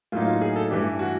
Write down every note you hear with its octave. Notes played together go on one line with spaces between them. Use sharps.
A2 F#3 A#3 D#4 F4
F4
G#4
A4
G2 E3 A3 D4 G4
F#4